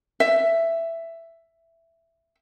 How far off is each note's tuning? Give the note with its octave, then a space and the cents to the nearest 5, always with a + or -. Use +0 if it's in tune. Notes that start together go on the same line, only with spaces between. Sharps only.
E5 +10